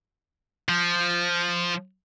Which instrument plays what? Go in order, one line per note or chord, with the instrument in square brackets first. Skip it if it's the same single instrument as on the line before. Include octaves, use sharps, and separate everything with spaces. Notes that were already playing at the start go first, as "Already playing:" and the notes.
[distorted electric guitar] F3